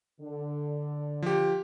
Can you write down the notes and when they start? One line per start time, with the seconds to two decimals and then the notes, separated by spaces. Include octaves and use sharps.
0.21 D3
1.23 F3 G4